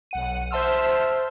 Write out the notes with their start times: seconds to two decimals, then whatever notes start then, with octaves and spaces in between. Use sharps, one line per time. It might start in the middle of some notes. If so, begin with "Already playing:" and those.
0.11 B1 F#5 D#7
0.51 C5 E5 A5 C6 E6 F6